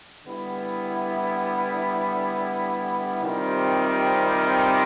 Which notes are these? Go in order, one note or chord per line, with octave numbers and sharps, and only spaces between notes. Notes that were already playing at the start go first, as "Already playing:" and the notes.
D3 G3 B3 E4
C3 D#3 G3 C4 F4